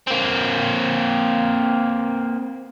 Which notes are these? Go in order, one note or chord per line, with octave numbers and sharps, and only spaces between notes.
A#3 C4